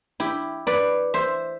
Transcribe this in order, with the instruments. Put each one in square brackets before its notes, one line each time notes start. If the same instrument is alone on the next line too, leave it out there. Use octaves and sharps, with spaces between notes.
[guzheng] E4 G4
B4 D5
C5 E5